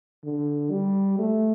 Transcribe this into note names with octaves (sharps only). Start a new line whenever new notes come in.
D3
G3
A3